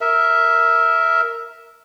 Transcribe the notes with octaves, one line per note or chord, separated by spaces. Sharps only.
A#4 E5